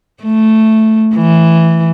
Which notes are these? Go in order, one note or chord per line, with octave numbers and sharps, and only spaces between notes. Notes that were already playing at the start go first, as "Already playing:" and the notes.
A3
E3